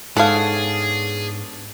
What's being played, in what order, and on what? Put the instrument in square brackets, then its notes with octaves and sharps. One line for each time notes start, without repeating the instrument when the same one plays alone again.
[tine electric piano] G#2 [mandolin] B3 D4 C#5 [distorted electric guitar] G#4 [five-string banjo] A4 F5